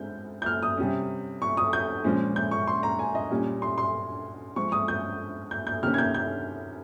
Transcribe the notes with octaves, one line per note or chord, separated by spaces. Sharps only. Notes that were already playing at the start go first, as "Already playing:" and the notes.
Already playing: G#3 C4 G6
G6
F6
D#6
C3 G3 C#4
C#6
D#6
G6
A#2 F3 G#3 C#4
G6
C#6
C6
A#5
G#5
D#5
A#2 G3 C#4
C6
C6
F3 G#3 C4 C#6
D#6
G6
G6
G6
C3 D#3 A#3 C#4 F6
G#6
G6
G6